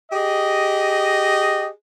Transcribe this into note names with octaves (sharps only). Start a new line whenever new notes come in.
G4 G#4 D#5